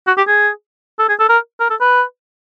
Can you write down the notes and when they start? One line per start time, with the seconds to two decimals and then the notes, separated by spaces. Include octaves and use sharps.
0.07 F#4
0.17 G4
0.28 G#4
0.99 A4
1.09 G#4
1.19 A4
1.29 A#4
1.60 A#4
1.70 A4
1.80 B4